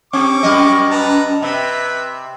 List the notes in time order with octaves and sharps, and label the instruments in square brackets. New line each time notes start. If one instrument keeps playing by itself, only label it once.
[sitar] C4 G4 [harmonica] C#6 D6
[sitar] F#2 G3 D#5
[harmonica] B4 A5 A#5
[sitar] C3 [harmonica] B4 E5